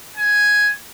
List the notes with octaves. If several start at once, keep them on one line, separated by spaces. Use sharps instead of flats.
G#5